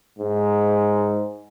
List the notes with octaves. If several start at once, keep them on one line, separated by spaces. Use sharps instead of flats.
G#2